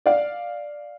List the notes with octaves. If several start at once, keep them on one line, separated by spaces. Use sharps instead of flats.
D5 F5